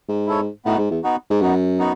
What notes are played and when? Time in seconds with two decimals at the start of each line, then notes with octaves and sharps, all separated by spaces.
0.08 G#2
0.27 E4 A4 C#5
0.65 A2 B3 D#4 F#4
0.78 G#2
0.90 E2
1.03 B3 D#4 F#4
1.30 G#2
1.41 F#2 B3 D#4 F#4
1.79 B3 D#4 F#4